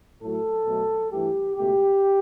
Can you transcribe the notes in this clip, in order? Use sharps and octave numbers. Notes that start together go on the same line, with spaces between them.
A2 F#3 A3 A4
B2 F#3 A3
G2 E3 A3 G4
C#2 B2 A3 G4